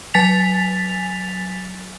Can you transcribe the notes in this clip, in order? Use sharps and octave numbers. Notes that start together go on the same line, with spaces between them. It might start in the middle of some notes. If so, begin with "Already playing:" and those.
F#3 G#5 A6 B6 F7